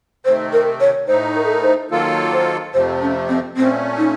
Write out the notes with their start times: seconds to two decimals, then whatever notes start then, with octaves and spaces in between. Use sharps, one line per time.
0.25 C3 D#3 A3 C4 C5
0.53 A#4
0.80 C#5
1.08 A2 A3 D#4 C5
1.36 A#4
1.45 A4
1.54 A#4
1.63 C5
1.91 D#3 F#3 A#3 F4 A4
2.33 C5
2.74 F2 C3 F3 A3 C5
3.01 C#4
3.29 C4
3.57 A#2 A3 C4 C#4
3.98 D#4